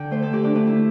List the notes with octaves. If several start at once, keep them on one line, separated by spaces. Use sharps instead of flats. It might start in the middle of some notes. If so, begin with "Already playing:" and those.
Already playing: D3 G5
A3 C5
A4
D3 G4
D4
A3 D4
E4